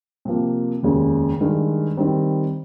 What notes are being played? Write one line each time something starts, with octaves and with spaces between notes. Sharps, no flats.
C3 F3 A#3
F1 D#2 C#3 G#3
G2 D#3 G#3
D#3 G3 C4